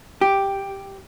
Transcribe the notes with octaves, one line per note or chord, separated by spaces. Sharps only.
G4